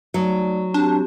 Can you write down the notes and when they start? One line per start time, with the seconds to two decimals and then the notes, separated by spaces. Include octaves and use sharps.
0.14 F#3 A3 D#4 D5
0.74 C4 D4 F#4 G4